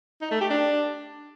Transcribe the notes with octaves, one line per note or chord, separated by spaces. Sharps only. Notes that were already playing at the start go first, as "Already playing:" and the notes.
D#4
A3
G4
D4